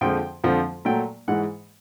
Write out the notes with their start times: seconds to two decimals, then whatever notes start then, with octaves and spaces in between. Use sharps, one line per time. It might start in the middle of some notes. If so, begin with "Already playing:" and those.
0.01 F2 D3 F3 G#3 G5
0.44 F2 D3 F3
0.85 A#2 F#3 A3 G5
1.28 G#2 E3 G#3 F#5